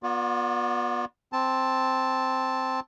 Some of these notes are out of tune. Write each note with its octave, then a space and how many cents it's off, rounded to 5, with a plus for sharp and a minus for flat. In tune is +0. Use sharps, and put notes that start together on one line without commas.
B3 -25 F4 +40 D5 +0
C4 +0 A5 +0